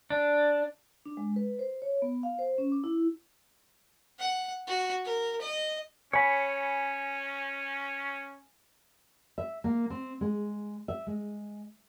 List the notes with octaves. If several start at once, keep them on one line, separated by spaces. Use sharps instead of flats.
D4
D4
G#3
B4
C5
C#5
B3
F5
C5
C#4
D6
E4
F#5
F#4
A#4
D#5
C#4 C#5 G#5 B5
E5
A#3
C4
G#3
E5
G#3